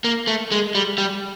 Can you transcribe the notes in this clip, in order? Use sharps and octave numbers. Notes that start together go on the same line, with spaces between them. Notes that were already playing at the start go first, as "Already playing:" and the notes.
A#3
A3
G#3
G3
G3